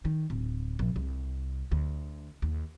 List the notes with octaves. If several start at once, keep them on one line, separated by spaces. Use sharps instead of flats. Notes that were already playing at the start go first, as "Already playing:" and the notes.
D#3
D1
A#1
C2
D2
D#2